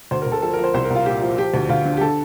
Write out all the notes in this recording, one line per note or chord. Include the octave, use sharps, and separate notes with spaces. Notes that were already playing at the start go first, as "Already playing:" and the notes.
D2 C5
A#4
D2
A4
F3 A4
A#4
F3
C5
C2 C5
A#4
C2
F4
A#2 G4
F3
F3 G4
D2
D2 F4
D3
G4
D3 A4